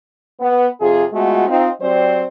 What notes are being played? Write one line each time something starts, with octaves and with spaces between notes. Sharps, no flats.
B3
F2 C3 F4 G#4
G#3 A3 B3 F4 F#4
C4 D#4 F4
F#3 C4 G4 C5 D5